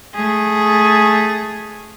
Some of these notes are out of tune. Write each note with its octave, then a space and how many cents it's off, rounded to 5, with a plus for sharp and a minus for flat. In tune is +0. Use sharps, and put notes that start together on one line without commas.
A3 -10 G#4 +0